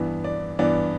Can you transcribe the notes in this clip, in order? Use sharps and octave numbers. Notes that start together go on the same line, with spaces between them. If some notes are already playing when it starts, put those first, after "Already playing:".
Already playing: G2 E3 B3
D5
G2 E3 B3 D5